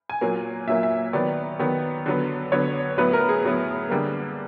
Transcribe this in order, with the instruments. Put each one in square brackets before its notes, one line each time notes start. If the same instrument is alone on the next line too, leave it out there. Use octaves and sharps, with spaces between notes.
[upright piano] G#5
A#2 F#3 A#3
A#2 F#3 A#3 E5
E5
D#3 F#3 B3 D5
D#3 F#3 B3
D3 F#3 B3
D3 F#3 B3 C#5
A2 F#3 B3 B4
A#4
G#4
A2 F#3 B3
D3 G3 A#3